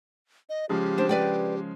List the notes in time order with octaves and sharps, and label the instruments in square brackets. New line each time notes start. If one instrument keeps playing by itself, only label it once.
[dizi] D#5
[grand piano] C#3 F3 G#3 [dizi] G4
[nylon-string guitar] D4 C5
B4 D5 G5